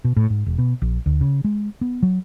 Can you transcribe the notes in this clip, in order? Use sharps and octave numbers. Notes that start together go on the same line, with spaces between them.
B2
A2
G#2
E1
B2
A#1
D2
C#3
G#3
B3
F#3